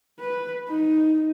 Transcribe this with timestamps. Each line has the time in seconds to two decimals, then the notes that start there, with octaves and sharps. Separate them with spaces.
0.19 B4
0.68 D#4